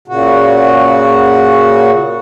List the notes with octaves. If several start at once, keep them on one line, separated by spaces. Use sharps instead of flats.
A#2 C#3 F#4